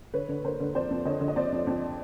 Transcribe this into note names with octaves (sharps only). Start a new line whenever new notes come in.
D3 B4 C#5
D3
D3 A#4 C5
D3
F2 C5 D5
F2
D3 C#5 D#5
D3
D#5
F2 C5 D5
F2
F2